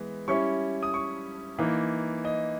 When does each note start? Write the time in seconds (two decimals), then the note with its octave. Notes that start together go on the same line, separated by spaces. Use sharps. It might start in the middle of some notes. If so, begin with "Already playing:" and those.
Already playing: E3 G#3 B3
0.28 G3 C#4 E4 C#6
0.83 D#6
0.94 C#6
1.58 E3 A#3 D#4
2.25 D#5